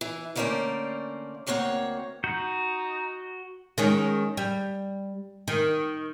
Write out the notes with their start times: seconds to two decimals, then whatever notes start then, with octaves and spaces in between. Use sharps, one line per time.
0.01 E3
0.36 D3 A3 A#3 C#4 C5 D5
1.47 D2 A#3 C4 C#5 F#5
2.24 D#4 F#4 G6
3.78 D#3 G#3 C#4
4.37 G3
5.48 D#3